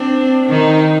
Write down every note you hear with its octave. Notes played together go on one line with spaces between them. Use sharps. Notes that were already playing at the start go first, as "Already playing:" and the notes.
Already playing: C4 D4
D#3 D#4